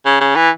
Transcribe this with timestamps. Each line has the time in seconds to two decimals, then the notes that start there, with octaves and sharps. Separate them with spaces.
0.06 C#3
0.21 C#3
0.36 E3